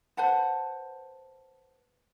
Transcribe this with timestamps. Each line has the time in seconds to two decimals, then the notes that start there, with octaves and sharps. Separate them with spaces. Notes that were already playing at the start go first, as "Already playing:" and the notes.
0.17 B4 C5 F#5 A5